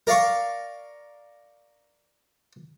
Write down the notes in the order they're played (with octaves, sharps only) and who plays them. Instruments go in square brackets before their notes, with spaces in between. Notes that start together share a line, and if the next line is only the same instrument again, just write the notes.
[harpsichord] A#4 D5 F5 C#6